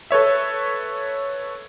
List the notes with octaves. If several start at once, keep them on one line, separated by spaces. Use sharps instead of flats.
A4 B4 C#5 E5